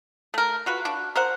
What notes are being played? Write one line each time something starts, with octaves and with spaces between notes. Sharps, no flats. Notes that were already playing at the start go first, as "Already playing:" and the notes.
A3 A#4
F4 F#4 B4
D4 F#4
A#4 C5 F#5